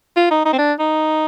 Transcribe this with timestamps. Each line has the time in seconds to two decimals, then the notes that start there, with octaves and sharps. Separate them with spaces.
0.17 F4
0.31 D#4
0.45 D#4
0.53 C4
0.58 D4
0.79 D#4